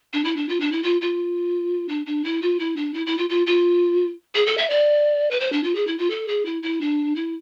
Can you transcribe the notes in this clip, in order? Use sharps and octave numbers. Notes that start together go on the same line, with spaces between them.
D4
E4
D4
F4
D4
E4
F4
F4
D4
D4
E4
F4
E4
D4
E4
E4
F4
F4
F4
G#4
A4
E5
D5
B4
C5
D4
F4
G#4
E4
F4
A4
G#4
E4
E4
D4
E4